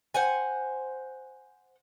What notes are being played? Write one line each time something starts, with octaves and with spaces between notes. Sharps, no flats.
C5 F#5 G#5